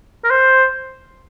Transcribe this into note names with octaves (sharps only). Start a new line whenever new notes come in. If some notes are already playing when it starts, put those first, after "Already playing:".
A#4
C5